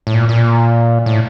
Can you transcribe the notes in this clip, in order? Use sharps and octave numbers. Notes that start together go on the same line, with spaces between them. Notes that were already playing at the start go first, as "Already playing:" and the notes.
A2
A#2
A#2
A2